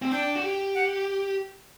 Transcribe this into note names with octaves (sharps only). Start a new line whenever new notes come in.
C4
D4 G5
F#4
G4
F#5